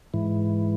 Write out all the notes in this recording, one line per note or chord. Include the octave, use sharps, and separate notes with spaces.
G#2 E3